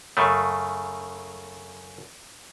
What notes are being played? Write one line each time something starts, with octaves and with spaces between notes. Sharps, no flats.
F#2 C#3 A3